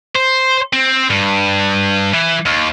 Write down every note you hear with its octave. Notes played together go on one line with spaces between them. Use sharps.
C5
C4
G2
E3
D#2